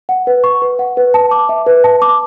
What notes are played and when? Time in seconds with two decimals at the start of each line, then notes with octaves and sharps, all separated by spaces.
0.09 F#5
0.27 B4
0.44 C#6
0.62 B4
0.79 F#5
0.97 B4
1.14 A5
1.31 D6
1.49 E5
1.66 B4
1.84 A5
2.02 D6